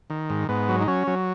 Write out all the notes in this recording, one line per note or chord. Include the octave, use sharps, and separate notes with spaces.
D#3
G#2
G#2 B3
F#3
D#4
F#3 C#4
F#3